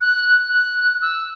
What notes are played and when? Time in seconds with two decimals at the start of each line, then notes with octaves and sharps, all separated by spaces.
0.01 F#6
0.49 F#6
1.01 E6